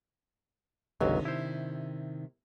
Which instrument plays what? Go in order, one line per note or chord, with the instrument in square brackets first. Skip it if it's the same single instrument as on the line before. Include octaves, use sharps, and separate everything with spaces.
[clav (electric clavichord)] G1 C#2 F#3 [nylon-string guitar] C3 D#3 D4
[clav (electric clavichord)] E4 C5